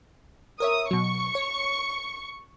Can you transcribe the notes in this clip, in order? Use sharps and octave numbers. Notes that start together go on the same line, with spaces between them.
A#4 C#5 E5 D#6
B2 F#3 C#6
C#5